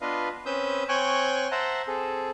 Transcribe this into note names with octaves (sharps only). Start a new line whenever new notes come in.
B3 D4 F4 B4 D#5 F5
C4 C#4 B4 D#6 E6 G6
C4 C#5 G5 G#5 C#6 F#6
C5 E5 F#5 A5 A#5
C4 G#4 A4